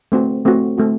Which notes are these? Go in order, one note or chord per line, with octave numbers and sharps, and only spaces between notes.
A3 C4 F#4
A3 C4 F#4
A3 C4 F#4